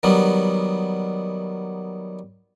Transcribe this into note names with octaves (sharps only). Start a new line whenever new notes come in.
D#3 F#3 G3 B3